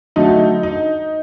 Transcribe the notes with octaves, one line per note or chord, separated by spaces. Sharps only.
D3 F#3 A3 D#4
D#4